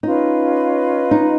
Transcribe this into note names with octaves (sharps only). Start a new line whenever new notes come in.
C#4 D#4 F4 B4 D#5
D#4